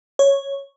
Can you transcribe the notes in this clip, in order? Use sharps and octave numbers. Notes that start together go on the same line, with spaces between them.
C#5